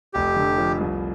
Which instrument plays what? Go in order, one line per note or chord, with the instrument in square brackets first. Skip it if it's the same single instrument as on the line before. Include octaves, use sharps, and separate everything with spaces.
[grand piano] F1 [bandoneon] G4
[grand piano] D3
F3
C2